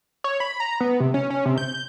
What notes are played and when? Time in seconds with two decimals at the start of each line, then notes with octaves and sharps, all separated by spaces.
0.24 C#5
0.40 B5
0.60 A#5
0.80 B3
1.00 C3
1.14 C#4
1.30 C#4
1.45 C3
1.58 G6